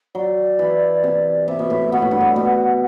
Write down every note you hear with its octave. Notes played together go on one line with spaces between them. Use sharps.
F#3 D5
E3
C3
C3 E5
B2
A2
B2 F#5
A2
G2
A2
B2